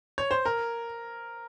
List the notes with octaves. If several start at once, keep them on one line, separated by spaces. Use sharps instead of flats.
C#5
C5
A#4